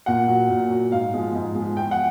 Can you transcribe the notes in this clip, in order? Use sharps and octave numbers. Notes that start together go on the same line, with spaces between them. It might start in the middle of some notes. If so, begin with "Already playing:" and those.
A#2 F#5
F#3
A#2
F#3
G#2 F5
F3 G#3
G#2
F3 G#3
E2 G5
F#5